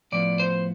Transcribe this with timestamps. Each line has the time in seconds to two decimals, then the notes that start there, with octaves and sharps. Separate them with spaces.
0.12 A2 F3 B3 D5
0.40 C5